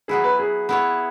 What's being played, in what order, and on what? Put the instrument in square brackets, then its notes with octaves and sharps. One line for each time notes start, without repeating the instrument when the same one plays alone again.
[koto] F#3 B3 E4 [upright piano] G#4
[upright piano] B4
G#4
[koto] B3 E4 C#5